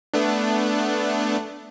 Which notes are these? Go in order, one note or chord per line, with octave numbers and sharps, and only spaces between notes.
A3 B3 D4